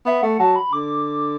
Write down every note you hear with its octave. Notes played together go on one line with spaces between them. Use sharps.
B3 E5
A3 F#5
F#3 A5
B5
D3 D6